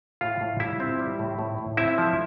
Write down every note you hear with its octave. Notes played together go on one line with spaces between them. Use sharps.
A2 F4 F5
A2
G3 E4 E5
C4
G3
A2
A2
A2
C4 E4 E5
F3